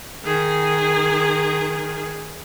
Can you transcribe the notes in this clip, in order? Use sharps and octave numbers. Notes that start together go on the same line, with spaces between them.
D#3 G#4